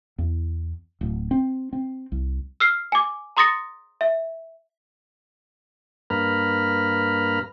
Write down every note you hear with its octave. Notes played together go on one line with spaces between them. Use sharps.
E2
D1
C4
C4
C2
E6 F6 C7
G#5 D6
A#5 C6 D#6 A6 A#6 C#7
E5
G2 A#3 B4 A#5 B5 F6